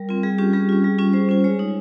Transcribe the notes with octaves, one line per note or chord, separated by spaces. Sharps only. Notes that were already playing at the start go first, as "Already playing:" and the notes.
Already playing: G3 A#4
C4 F4
G3 G#4
C#4 F4 G4
G3 G#4
C#4 F4
G3
C#4 F4
G3 C5
C#4 F4
G#3 C#5
D#4